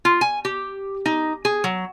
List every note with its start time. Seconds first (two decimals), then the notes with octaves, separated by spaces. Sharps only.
0.05 F4
0.21 G#5
0.45 G4
1.06 D#4
1.45 G#4
1.64 F#3